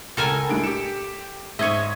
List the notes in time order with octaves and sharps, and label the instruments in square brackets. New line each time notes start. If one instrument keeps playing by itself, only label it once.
[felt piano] C#2 [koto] A4 A#4 G#5
[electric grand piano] A2 D7 [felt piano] G3 G#3 D4
[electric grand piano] G4 E7 [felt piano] C#7
[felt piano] G#2 [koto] C#5 D#5 [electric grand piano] E5 G#6 D#7